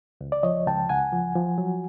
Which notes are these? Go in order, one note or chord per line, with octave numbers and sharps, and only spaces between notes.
C#2
D5
F3 C#5 D#5
C#2 G5 A5
C#2 F#5 G#5
F3
F3
F#3